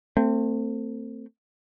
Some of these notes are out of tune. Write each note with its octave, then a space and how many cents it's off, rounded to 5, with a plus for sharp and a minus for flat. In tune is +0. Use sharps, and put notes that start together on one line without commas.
A3 +35 C4 +0